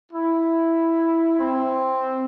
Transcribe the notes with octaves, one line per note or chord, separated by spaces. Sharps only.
E4
C4